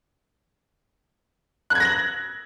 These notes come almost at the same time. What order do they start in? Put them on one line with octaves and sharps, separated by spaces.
F#6 G#6 A#6 F#7